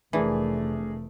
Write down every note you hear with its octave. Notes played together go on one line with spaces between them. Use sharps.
F1 E3 A3 D4 G#4 A#4